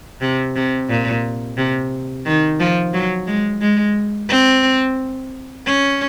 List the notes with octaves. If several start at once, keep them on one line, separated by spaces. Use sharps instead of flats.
C3
C3
A#2
C3
D#3
F3
F#3
G#3
G#3
C4
C#4